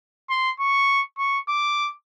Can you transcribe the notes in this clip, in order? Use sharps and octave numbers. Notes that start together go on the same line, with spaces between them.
C6
C#6
C#6
D6